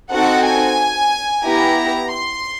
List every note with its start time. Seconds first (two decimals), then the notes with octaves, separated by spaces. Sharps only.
0.12 C4 D#4 F#4 A4 F#5
0.45 G#5
1.44 B3 E4 G4 A#5
2.11 C6